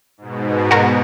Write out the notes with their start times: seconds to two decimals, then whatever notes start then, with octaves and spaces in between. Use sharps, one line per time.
0.18 G#2 B2
0.71 F#4 A#4